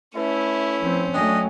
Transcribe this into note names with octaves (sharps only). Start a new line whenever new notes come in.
A3 C#4 E4 B4 E5
F3 C4
F#3 A3 D4 D#5 G5 G#5